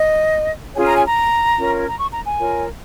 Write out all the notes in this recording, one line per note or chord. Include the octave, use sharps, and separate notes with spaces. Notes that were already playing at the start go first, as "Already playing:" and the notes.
Already playing: D#5
C#4 F4 G#4 C#5 G#5
A#5
G#5
A#5
C#4 F4 A#4 C#5
A#5
C#6
A#5
G#5
F4 A#4 C#5